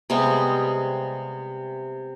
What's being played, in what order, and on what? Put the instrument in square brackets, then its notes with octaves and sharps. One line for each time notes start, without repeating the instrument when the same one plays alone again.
[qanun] C3 G3 G#3 B3